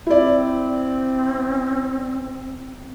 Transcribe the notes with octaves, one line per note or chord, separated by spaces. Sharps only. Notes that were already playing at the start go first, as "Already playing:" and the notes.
C4 E4 D5